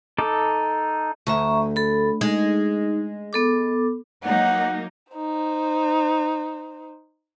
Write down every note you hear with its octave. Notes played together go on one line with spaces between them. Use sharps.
D#4 A4 D6
D2 E5 A#5 C#6
A4 B5
G#3 D#4
B3 A4 D6
F#3 A#3 D#4 F#5
D#4 C5